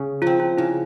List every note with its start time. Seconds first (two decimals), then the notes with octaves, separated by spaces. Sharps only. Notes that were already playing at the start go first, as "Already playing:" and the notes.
Already playing: C#3
0.22 F3 C4 F4
0.40 F4
0.58 C#3 E4